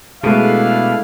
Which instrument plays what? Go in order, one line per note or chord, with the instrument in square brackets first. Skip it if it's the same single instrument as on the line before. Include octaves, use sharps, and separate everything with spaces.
[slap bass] B2 [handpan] G#3 A3 A4 [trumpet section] D4 E4 F5